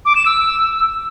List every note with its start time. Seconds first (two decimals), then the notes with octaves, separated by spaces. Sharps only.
0.05 D6
0.16 E7
0.26 E6